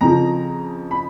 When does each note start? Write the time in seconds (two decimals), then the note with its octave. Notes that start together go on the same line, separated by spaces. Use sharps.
0.01 F2 C#3 F3 A#5
0.91 B5